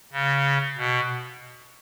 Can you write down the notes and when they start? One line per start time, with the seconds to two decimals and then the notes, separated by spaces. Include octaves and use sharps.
0.13 C#3
0.77 B2